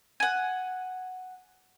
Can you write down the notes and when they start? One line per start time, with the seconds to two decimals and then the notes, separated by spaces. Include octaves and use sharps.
0.20 F#5 G#5